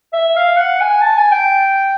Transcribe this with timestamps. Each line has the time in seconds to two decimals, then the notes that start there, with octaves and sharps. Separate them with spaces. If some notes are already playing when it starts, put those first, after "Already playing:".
0.13 E5
0.36 F5
0.57 F#5
0.80 G#5
1.01 A5
1.17 G#5
1.32 G5